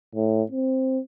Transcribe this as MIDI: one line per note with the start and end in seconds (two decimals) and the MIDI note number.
0.15 0.43 45
0.52 1.00 60